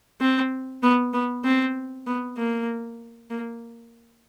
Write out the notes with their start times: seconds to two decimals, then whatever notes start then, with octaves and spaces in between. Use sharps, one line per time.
0.21 C4
0.83 B3
1.13 B3
1.44 C4
2.07 B3
2.37 A#3
3.30 A#3